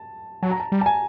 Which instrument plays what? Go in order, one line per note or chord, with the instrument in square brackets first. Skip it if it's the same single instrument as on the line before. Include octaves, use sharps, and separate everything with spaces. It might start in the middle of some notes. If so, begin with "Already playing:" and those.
Already playing: [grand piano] A5
[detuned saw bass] F#3 [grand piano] A5
[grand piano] A#5
A5
[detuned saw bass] G3
[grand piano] A5
G#5